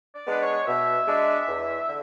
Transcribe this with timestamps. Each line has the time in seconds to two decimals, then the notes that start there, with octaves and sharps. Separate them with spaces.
0.13 D5
0.27 G#3 B3 D4 B4
0.40 C#5
0.66 B2 E5
1.07 G#3 D4
1.48 E2
1.88 D3